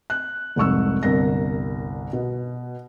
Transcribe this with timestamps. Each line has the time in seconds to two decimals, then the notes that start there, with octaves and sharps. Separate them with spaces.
0.10 F#6
0.56 F1 C2 G#2 C#6 E6
1.03 G1 C2 A#4 A#6
2.13 B2